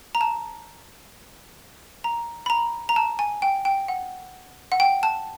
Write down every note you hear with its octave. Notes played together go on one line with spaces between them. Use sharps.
A#5
A5
A#5
B5
A#5
A#5
A5
G#5
G5
G5
F#5
F#5
G5
A5